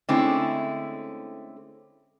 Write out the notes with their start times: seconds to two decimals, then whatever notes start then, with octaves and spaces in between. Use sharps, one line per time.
0.09 D3 G#3 A3 C4 C#4 E4